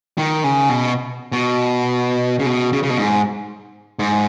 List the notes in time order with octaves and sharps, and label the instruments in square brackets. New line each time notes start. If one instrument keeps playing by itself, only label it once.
[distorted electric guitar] D#3
C#3
B2
B2
C#3
B2
C#3
C#3
B2
G#2
G#2